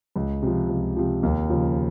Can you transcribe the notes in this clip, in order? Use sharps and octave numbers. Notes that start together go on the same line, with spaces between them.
C#2
C3 F3
C#2
C3 F3
D#2
C#3 F3